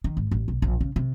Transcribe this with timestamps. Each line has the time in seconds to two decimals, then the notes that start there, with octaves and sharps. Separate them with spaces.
0.04 D#3
0.17 G#1
0.31 A1
0.48 B1
0.62 A#1
0.81 C#3
0.96 C3